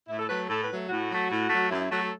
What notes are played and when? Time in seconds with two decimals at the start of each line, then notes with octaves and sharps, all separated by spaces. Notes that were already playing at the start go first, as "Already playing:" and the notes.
0.08 A2 E4
0.19 A4
0.28 F#3 A3 B4
0.48 A2 A4
0.62 B4
0.70 F#3 A3
0.89 A2 F#4
1.09 F#3 A3
1.30 A2
1.50 F#3 A3
1.70 F#2 E4
1.81 E4
1.90 F#3 A3 F#4
2.01 A4